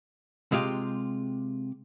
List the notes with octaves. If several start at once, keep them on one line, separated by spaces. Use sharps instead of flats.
C3 G#3 F4 G4